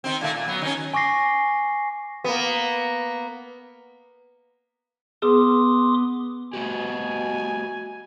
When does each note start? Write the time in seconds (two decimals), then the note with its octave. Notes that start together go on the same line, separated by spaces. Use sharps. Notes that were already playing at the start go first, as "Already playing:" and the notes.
0.04 D#3 C4
0.21 A#2 A3 A#3
0.35 A#2
0.48 F#3 B3
0.62 D#3 C#4
0.94 G#5 C#6 D6 A#6 C7
2.24 A#3 B3
5.22 B3 G#4 C6 D6 D#6
6.53 B2 A3 F#4 G4 G#5